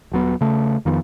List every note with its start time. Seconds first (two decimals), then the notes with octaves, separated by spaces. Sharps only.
0.12 D#1 F#3 B3
0.41 C#3 A3
0.85 F2 D#3 F3 B3